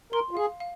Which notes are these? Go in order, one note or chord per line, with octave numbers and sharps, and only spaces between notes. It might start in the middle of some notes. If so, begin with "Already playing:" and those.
A#4 C6
F4
G#4 F5
F5